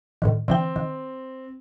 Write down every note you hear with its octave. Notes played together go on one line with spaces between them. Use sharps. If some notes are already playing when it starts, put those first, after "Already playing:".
A2 D3 D#3
D3 E3 C4 G5
D#3